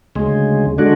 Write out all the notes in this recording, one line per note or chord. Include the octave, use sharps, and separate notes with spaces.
D2 C#3 G#3
D3 G#3 D4 F#4